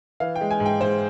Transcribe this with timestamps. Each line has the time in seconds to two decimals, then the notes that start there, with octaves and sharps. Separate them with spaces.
0.20 E3 F5
0.36 G5
0.41 G#3
0.51 G#5
0.60 G#2
0.66 G5
0.81 G#2 C5